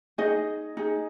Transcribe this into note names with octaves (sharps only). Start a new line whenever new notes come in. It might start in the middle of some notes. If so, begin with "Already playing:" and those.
D#4 G#4 D#5
D#4 G#4